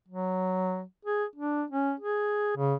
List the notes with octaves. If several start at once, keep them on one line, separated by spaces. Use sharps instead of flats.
F#3
G#4
D4
C#4
G#4
C#3